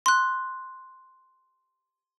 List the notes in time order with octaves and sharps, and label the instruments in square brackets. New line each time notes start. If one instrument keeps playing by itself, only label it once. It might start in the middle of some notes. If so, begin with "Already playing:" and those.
[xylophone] C6 F#6